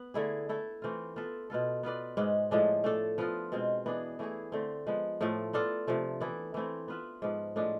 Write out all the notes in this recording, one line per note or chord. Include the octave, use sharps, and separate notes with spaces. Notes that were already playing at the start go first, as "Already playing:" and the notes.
Already playing: B3
D3 A3 E4 G#4
A3 E4 A4
E3 A3 C4 F4
B3 F4 A4 E5
B2 B3 F4 A4
B3 F4 B4 D5
G#2 G#3 B3
A2 F3 G#3 D4
A3 D4 A4
F3 B3 F4 A4
B2 G#3 C4 F4
E3 B3 D4 G#4
E3 A3 E4 G#4
D3 A3 C4
F3 G#3 B3
A2 F3 A3
B3 D4 F4 A4
C3 F3 A3
E3 B3 E4 A4
E3 A3 C4 E4
B3 F4 B4 E5
G#2 F3 B3
A2 F3 G#3 D4